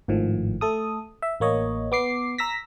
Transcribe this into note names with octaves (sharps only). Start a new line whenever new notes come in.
G#1 A2 D#3 F3
A3 A4 D#6
E5
A1 A#3 C#5 D#5
B3 D6 C7
A#5 E6 A#6 B6